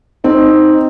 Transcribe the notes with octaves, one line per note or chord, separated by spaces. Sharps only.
C4 D#4